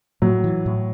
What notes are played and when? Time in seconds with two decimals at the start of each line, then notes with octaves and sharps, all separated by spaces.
0.22 A2 F#3
0.44 E3
0.66 A2